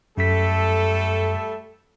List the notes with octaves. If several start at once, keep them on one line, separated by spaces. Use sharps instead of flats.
F#2 G3 A3 A4 B6